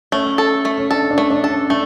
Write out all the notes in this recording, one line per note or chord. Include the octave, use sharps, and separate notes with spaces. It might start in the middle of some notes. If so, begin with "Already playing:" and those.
A3 C#4
A4
A3
C#4
D4 A4
D4
A3
D4
A4
C#4
A3 D4